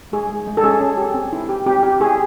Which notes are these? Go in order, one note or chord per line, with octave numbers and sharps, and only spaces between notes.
G#3 G#4
G#3
G#3
A4
C#4 G#4
C#4
G4
C4
E4
G4
C4 G4
G4
E4 G#4